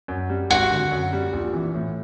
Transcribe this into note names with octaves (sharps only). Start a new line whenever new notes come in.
F#2
G3
G#1 F#4
D3
F#2
G3
A#1
E3
A2